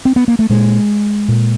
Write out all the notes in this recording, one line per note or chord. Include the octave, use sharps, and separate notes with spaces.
C4
B3
A#3
A3
A#2 G#3
A#2